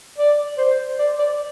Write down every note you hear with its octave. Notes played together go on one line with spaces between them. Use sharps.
D5
C5
D5
D5